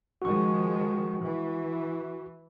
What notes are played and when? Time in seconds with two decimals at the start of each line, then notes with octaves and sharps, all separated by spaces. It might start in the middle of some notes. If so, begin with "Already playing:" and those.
0.22 D#3 F3 G#3 F#4 C#6
1.23 E3